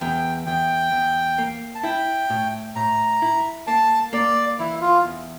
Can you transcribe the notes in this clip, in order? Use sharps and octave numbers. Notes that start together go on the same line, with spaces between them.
E2 G5
E2 G5
E2
A#3
A5
E4 G5
A2
A2 A#5
E4
A#3 A5
A#3 D5
E3 E4
F4
E2